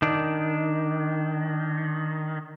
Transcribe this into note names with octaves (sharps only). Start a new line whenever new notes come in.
D#3 D4